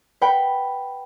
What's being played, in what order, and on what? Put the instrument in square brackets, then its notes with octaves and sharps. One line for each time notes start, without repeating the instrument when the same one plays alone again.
[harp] B4 F#5 G5 B5